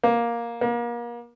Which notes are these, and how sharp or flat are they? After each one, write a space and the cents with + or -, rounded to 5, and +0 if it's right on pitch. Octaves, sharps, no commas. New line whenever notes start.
A#3 +10
A#3 +35